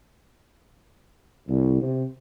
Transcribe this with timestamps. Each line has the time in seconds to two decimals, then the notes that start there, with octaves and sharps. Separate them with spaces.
1.48 C2
1.82 C3